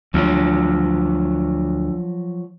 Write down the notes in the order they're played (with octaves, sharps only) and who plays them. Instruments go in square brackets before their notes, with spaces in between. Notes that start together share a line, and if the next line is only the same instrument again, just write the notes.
[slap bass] D2 [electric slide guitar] F3 F#3